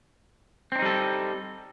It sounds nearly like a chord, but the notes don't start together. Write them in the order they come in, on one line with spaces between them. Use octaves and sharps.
C4 D4 D#4 G3 A4